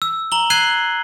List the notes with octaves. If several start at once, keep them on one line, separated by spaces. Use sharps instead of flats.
E6
A#5 F#7 G7
F#6 G#6 C7 D#7 F#7 G7